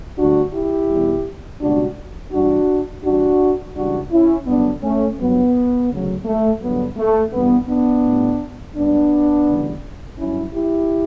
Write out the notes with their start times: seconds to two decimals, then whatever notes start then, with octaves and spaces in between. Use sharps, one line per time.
0.18 D2 D3 G3 D4 F#4
0.54 E4 G4
0.90 E2 B2 G3
1.61 C#2 B2 G3 D4 F#4
2.32 G2 E3 G3 D4 F#4
3.04 G2 E3 G3 D4 F#4
3.75 C#2 C#3 E3 G3 D4 F#4
4.11 C#4 E4
4.47 G2 D3 F#3 B3 D4
4.83 A3 C#4
5.19 G2 F#3 B3
5.90 D2 C#3 F#3
6.25 A3
6.61 G2 D3 F#3 B3
6.97 A3
7.33 G2 E3 G3 B3
7.69 B3 D4
8.05 A2 G3
8.76 G2 F#3 B3 D4
9.47 D2 C#3 E3 G3
10.19 G2 F#3 C#4 E4
10.54 E4 G4